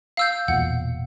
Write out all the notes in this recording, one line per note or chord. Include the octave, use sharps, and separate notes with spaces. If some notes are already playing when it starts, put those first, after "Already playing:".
F5 E6 G6
E1 E2 A#2 F#5